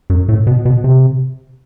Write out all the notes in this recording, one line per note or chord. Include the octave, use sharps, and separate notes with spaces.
F#2
A2
B2
B2
C3